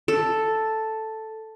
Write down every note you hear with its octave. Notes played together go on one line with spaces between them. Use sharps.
A4